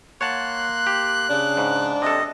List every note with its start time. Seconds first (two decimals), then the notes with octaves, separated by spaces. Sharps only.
0.21 A#3 C#5 F#5 A5 C6 F#6
0.87 G4
1.29 C#3 D4
1.57 G#2
2.02 C3 A4 D#5